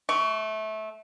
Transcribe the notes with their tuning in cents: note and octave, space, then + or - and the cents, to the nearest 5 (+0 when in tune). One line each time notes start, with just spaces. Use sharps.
A3 -20 C#6 +20